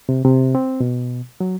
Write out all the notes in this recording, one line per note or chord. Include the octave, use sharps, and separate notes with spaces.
C3
C3
C4
B2
F#3